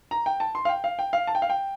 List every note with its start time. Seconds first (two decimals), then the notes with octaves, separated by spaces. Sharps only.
0.11 A#5
0.26 G5
0.40 A5
0.55 C6
0.65 F5
0.69 G5
0.84 F5
0.99 G5
1.13 F5
1.27 A5
1.35 G5
1.42 F5
1.50 G5